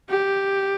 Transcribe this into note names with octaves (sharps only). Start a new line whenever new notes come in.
G4